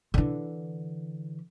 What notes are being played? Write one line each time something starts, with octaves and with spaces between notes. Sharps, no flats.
D3 E3